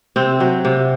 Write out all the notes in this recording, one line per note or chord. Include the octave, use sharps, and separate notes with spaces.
C3 C4
F#3
C3